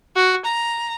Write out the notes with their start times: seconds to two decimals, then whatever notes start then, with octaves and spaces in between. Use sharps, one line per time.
0.16 F#4
0.45 A#5